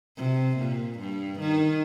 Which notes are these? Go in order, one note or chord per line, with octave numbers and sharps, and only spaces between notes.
C3
A#2
G2
D#3